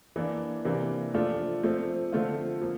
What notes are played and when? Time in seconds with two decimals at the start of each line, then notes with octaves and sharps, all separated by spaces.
0.16 E3 A#3 D4
0.65 C3 E3 A#3 D4
1.14 F3 A3 D4 F4
1.63 F3 A3 C4
2.12 D3 F3 A3 C4 F4
2.62 F3 A#3